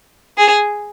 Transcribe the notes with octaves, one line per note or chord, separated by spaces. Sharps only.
G#4